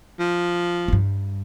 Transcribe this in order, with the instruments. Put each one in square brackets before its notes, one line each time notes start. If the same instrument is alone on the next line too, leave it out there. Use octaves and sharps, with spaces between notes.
[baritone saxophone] F3
[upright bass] G2 E4